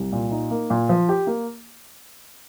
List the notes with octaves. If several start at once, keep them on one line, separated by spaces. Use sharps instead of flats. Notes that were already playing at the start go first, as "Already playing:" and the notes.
Already playing: C2
A#2
D#4
A#3
A#2
F3
G4
A#3